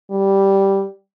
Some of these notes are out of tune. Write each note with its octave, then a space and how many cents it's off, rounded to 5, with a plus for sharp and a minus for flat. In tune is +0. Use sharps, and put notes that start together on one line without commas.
G3 -5